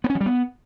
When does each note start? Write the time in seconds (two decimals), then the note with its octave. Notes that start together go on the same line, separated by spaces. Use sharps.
0.04 B3
0.10 C#4
0.15 F3
0.21 G3
0.26 B3